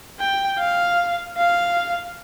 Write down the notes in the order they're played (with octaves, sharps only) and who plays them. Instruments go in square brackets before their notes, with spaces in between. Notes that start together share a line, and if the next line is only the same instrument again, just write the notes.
[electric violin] G5
F5
F5